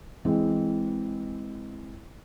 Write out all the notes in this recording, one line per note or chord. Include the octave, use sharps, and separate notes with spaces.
E3 G#3 C4